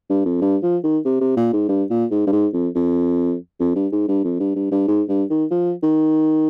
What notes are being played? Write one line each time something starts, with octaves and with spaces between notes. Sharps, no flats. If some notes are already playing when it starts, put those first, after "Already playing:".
G2
F2
G2
F3
D#3
C3
C3
A#2
G#2
G2
A#2
G#2
G2
G#2
F2
F2
F2
G2
G#2
G2
F2
G2
G2
G2
G#2
G2
D#3
F3
D#3